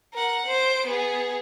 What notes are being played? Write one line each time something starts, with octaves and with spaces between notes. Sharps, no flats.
A#4 F#5
C5 D7
B3 G#4